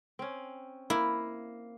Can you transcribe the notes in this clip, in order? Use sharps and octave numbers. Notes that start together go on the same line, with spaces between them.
C4 C#4
A#3 E4